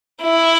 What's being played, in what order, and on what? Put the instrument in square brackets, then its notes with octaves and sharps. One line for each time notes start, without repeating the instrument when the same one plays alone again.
[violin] E4